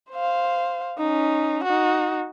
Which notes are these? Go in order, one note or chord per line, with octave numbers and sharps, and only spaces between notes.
C5 F5
C#4 D#4
D#4 F#4